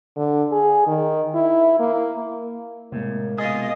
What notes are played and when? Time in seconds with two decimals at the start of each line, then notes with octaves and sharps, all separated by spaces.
0.17 D3
0.52 G#4
0.87 D#3
1.35 E4
1.80 A#3
2.92 A2 C3 G#3 A#3
3.38 B2 F4 G#4 D#5 F5